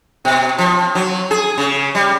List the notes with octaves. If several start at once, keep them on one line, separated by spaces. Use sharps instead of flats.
B2
F3
F#3
G#4
C#3
G3